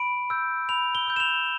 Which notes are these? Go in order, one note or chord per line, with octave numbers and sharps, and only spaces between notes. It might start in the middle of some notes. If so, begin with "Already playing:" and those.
Already playing: B5 D7
E6 G6
B5 F7
G7
E6 G6
E7
F7